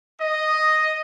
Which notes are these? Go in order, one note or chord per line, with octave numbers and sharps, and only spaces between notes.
D#5